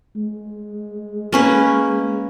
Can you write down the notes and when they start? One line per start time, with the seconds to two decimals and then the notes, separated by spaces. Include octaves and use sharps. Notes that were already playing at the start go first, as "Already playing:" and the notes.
0.17 G#3
1.33 A#3 C#4 B4